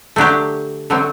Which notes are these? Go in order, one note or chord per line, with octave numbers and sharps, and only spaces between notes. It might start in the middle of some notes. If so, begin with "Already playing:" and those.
D3 F#3 A3 D4 G4
D3 F#3 A3 C4